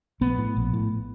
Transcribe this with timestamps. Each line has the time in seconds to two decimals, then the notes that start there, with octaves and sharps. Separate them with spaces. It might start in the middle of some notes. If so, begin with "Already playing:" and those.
0.21 A#1 B3
0.38 A2
0.57 A#1
0.73 A2